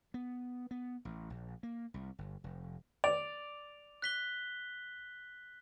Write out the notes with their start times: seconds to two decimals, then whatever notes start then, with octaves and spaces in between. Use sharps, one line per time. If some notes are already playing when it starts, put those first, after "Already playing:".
0.14 B3
0.71 B3
1.05 A1
1.30 A#1
1.63 A#3
1.94 C2
2.18 G1
2.44 F1
3.04 D5 F7
4.02 F#6 B6 G7